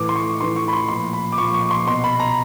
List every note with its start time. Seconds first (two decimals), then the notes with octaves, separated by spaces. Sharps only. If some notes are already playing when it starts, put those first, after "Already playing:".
Already playing: A2 E3 D6
0.09 C6
0.16 C#6
0.40 A2 E3 C6
0.56 C#6
0.68 B5
0.73 C6
0.88 A#2 F3 C6
1.13 B5
1.32 D6
1.38 A#2 F3 C#6
1.54 C#6
1.71 C6
1.87 B2 C6
2.04 B5
2.20 A#5